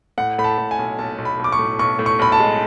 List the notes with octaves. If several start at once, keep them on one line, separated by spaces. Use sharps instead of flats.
A2 F#5
A2 B5
A5
A2
G#5
B1
B1 A5
B1
B5
B1
D6
C#6
A2
B1 C#6
A2
C#6
B1 B5
A5
G#3